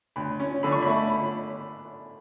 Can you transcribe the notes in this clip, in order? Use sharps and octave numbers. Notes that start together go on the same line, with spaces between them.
D2 B5
C#4
D3 B5
C#6
A3 B5
B5